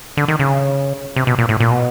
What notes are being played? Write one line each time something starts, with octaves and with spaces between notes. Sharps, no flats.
D3
D#3
C#3
C3
B2
A#2
A2
A#2
B2